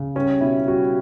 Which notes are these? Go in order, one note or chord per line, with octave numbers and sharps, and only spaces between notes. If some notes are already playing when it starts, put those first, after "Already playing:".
Already playing: C#3
G3 C#4
B2 E4
G3 F#4